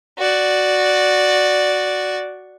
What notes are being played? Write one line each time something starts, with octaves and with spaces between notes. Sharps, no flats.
F#4 D5